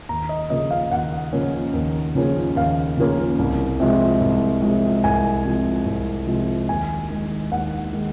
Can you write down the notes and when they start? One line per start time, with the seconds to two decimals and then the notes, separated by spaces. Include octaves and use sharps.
0.09 D#2 A#5
0.29 D#5
0.50 C#3 F3 A#3 C#4 D#5
0.71 F5
0.91 D#2 F#5
1.33 C#3 F3 A#3 C#4
1.74 D#2
2.15 C#3 F3 A#3 C#4
2.56 D#2 F5
2.97 C#3 F3 A#3 C#4
3.39 C2
3.80 C3 F3 G#3
4.21 C2
4.62 C3 F3 G#3
5.04 C2 G#5
5.45 C3 F3 G#3
5.86 C2
6.27 C3 F3 G#3
6.69 D#2 G#5
7.10 D#3 G#3
7.52 D#2 F#5
7.93 D#3 G#3